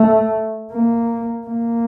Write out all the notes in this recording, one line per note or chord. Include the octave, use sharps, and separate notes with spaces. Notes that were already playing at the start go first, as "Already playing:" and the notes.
Already playing: A3
A#3
A#3